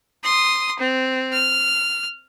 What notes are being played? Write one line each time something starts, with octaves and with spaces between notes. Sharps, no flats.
C6 D#6
C4
F6